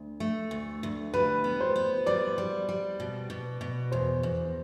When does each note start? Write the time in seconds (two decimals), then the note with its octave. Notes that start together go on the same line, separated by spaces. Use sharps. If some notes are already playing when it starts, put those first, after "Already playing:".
Already playing: D2
0.20 A3
0.51 D2
0.83 D2
1.14 G3 B4
1.44 B3
1.61 C5
1.76 B3
2.07 G3 D5
2.38 G3
2.69 G3
3.00 B2
3.30 B2
3.61 B2
3.92 E2 C5
4.23 E2